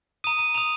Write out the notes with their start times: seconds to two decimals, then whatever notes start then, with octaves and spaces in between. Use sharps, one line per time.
0.24 A#5 D#6 D#7
0.39 D#7
0.54 A#5 D#6 F7